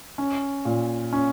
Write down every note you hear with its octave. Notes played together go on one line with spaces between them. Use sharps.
C#4
A#2
C#4